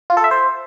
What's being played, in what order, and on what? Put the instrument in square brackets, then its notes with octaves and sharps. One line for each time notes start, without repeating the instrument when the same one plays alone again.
[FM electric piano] F4
A4
E5
C5